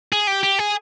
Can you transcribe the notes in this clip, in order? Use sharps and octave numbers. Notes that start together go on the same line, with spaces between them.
G#4
G4
G4
G#4